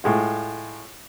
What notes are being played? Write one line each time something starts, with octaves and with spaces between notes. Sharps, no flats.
A2 G#3 F4